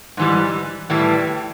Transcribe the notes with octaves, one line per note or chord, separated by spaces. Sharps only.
G#2 E3 G3
A2 E3 G3